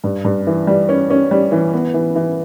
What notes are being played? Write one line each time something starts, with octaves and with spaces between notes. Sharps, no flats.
G2
G2
E3
G3
C#4
C#4
G3
E3
B3
E3
E3